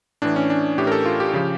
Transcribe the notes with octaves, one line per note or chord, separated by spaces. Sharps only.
A2 E3 D4
C#4
D4
A2 E3 G4
A#4
A4
F4
G4
C#3 F3